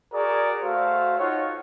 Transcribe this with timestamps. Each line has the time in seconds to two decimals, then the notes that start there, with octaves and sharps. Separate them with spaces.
0.13 F#4 G#4 A#4 D5
0.63 A3 F#4 C5 F5
1.19 D#4 F4 C#5 F#5